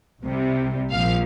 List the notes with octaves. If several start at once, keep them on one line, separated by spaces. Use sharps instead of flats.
C2 C3 G3
A#1 A#2 F3 F5